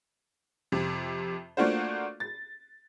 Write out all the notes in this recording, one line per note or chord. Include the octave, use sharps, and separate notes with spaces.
F2 C3
A3 A#3 D4 F4 F#4 C5
A6